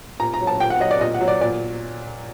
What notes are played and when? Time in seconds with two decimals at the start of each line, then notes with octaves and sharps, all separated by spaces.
0.20 A#2 A#5
0.34 A#5
0.40 F#3
0.47 A5
0.60 A#2 G5
0.70 F#5
0.80 F#3 D#5
0.91 D5
1.01 A#2 D#5
1.14 F#5
1.21 F#3
1.28 D5
1.41 A#2 D5